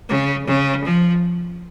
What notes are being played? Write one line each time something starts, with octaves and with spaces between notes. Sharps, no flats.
C#3
C#3
F3